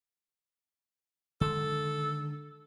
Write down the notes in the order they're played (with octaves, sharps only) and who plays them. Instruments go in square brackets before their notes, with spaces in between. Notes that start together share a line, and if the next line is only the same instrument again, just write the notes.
[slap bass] D3 D#3 G#3 [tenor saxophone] A4